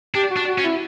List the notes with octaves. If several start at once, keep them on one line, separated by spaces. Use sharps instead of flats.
D4 G4
F#4
D4
F#4
C#4
E4